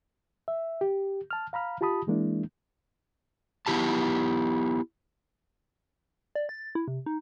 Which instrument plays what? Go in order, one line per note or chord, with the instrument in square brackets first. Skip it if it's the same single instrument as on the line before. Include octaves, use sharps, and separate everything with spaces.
[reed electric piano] E5
G4
A5 F6
F5 A#5 B5 F6
F4 G4 A5 B5 D#6
E3 G#3 A#3 D4 E4
[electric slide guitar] B3 E4 G4 A5
[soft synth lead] D5
A6
E4
C3
D#4